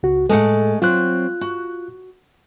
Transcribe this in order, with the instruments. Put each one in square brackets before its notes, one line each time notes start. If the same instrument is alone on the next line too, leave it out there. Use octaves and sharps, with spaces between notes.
[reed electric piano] C#2 F#4
[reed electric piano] A2 A4 [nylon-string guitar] G#3 A3 F#5
[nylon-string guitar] F#3 C4 [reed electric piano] F4 F#6
[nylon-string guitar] F#4